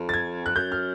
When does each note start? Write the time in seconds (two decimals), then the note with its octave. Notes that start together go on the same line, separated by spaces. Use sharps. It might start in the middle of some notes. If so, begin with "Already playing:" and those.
Already playing: F2
0.09 A6
0.14 G#6
0.46 F#6
0.56 F#2 G6
0.72 F6